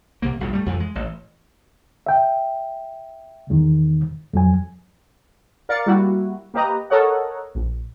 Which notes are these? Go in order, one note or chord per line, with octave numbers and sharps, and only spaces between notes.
C2 C3 A#3
A#1 G2 B2
G3 A3
F2 E3 F3
G#3
A1
E5 G5
E2 D#3
F2 F#3 G#5
A#4 D5 F5 A6 C#7
G3 A#3 E4 F#4
A#3 G4 B4 D#5 A#5
A4 A#4 C#5 D#5 F#5
A#1